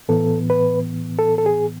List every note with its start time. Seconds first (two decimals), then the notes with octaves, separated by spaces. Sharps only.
0.09 A2 E3 B3 A4
0.50 B4
1.19 A4
1.38 A4
1.46 G#4